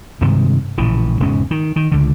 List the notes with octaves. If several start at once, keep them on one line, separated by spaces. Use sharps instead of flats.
G2 C3 D#3 G#3
A#1 A2 C#3 E3
E1 G#2 C#3 C#4
D#3
D#3
C#2 D3